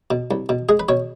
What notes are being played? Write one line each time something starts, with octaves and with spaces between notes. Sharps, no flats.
B2
C2
B2
G#3 G#4
B4
B2 C#5